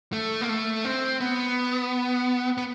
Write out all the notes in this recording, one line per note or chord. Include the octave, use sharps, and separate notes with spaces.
A3
A#3
A3
C4
B3
B3